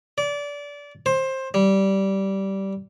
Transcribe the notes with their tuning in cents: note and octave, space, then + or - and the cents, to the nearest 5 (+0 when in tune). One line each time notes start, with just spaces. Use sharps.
D5 -25
C5 +15
G3 -15